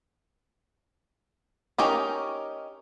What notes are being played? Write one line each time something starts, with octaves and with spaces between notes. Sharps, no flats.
C#4 D#4 G4 A#4